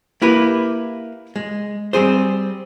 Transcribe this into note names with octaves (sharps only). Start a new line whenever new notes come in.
A#3 E4 G4 B4
G#3
G3 C4 G#4 C5